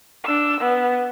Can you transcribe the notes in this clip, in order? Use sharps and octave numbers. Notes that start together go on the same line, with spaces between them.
D4 E6
B3